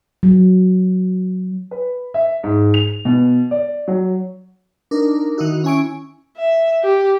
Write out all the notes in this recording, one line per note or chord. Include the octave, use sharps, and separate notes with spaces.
F#3
B4
E5
G#2
F7
B2
D5
F#3
D4 D#4 A#4
D#3 D#4 E4 F#4
C#4 E4 G#5 C#6 D7
E5
G4